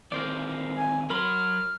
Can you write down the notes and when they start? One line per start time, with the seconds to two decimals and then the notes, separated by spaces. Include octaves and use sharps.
0.12 D#3 E3 C4 A#4 C5 D5
0.75 G#5
1.10 F#3 A#4 B5 C6 F6